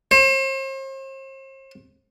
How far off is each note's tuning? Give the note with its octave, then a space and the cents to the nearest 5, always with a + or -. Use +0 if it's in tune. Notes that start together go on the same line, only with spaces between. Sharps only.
C5 +40